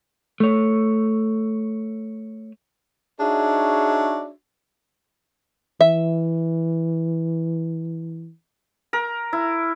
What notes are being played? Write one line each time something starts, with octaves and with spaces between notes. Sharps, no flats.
A3 C#5
D4 D#4 F#4 G#4 C#5 E5
E3 E5
A#4
E4